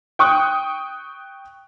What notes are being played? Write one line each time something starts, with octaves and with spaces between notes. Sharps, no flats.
G5 C#6 D#6 F#6